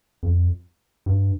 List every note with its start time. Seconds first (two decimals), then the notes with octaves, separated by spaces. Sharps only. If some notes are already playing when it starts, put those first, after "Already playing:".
0.23 F2
1.06 G2